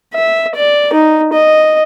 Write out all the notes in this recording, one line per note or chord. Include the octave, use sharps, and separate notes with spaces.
E5
D5
D#4
D#5